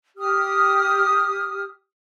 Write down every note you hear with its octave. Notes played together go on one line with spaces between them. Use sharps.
G4 D#6 F6